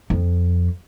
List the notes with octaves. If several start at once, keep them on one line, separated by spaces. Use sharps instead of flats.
F2